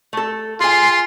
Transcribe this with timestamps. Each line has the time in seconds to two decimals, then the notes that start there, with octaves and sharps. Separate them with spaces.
0.13 A3 A4
0.60 F4 G#4 G#5 C6